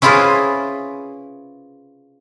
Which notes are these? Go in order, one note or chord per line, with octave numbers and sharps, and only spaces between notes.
C#4 E4 F4 G#4 B4 C5